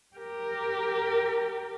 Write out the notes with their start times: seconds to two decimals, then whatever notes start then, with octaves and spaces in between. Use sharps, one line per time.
0.17 G4 A#4